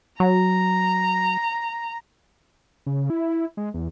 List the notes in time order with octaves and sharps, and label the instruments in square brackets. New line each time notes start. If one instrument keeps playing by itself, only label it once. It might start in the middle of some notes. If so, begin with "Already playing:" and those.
[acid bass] F#3 [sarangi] A#5
[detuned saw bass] C#3
E4
G#3
E2